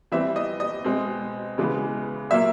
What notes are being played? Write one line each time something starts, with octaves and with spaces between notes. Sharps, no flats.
E3 G3 C4 E5
D#5
D#5
B2 G#3 C4
C#3 E3 G#3 B3
A#2 F#3 A#3 E5